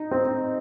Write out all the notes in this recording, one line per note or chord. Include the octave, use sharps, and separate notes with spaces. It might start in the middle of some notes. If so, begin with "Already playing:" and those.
Already playing: D#4
C4